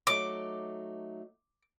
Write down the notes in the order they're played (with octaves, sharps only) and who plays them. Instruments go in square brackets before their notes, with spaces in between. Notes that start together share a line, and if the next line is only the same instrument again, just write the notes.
[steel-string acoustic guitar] F#3 A3 D#4 [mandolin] D6